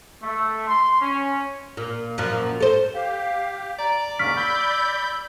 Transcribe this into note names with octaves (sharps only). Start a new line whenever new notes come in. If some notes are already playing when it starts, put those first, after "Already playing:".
A3
C6
C#4
A#2
F#2 A#2 F3
A4 C5
G4 F5
D5 A#5
D#2 G#2 C#3 C#6 F6 B6
B5 E6 G6